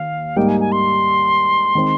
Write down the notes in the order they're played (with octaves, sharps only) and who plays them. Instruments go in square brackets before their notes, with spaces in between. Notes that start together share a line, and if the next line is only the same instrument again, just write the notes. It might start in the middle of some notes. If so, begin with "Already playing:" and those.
Already playing: [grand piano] D#2 [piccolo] F5
[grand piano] G#2 G3 A#3 D#4 [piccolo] G5
[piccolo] G#5
G#5
C6
[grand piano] D#3 G#3 C4